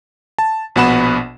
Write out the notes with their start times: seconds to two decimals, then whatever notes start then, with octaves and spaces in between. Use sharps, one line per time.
0.38 A5
0.76 A#1 B2 B3 F#5 B5 E7